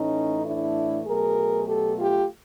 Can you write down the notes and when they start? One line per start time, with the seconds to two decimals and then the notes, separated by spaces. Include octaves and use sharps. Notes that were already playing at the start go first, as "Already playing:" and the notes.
Already playing: A2 E3 A3 C#4 D#4
0.45 D4 E4
1.06 B2 F#3 A3 G#4 A#4
1.67 G4 A4
1.98 F4 G4